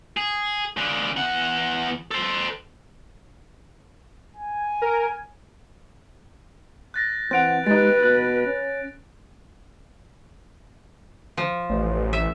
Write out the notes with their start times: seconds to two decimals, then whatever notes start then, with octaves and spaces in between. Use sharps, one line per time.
0.17 G#4
0.77 C#3 D4
1.17 E2 F#5
2.11 A4 C5
4.36 G#5
4.82 A#4
6.94 F#6 A6 A#6
7.31 E3 C4 F#5 F#6 D7 F7
7.66 G#3 D#4 G4 B4 A6
8.03 B2 F#6
8.46 C#4
11.37 F3
11.69 A1
12.13 E5